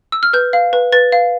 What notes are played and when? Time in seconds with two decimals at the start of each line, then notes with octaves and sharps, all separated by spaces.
0.12 E6
0.23 F6
0.33 B4 G6
0.53 F5
0.73 B4
0.92 B4 A6
1.12 F5